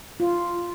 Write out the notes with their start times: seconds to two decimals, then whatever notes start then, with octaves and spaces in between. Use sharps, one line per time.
0.20 F4